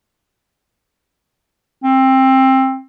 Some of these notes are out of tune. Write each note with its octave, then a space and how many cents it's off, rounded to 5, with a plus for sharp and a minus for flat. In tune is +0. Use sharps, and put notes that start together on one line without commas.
C4 +20